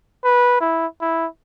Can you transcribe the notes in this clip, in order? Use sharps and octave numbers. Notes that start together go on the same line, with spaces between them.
B4
E4
E4